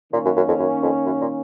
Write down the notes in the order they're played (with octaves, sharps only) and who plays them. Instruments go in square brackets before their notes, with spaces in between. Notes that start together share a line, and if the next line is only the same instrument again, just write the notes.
[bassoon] A#2 [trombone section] D#3 A#3 C#4
[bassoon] F#2
F#2
F2
F#2
F2
F#2
A#2